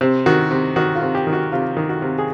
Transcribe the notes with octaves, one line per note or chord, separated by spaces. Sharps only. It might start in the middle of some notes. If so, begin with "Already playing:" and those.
C3 C5
D#3 F#4
C3
D#3 F#4
F4
C3
G4
D#3
F#4
C3 F4
D#3
F#4
C3
G#4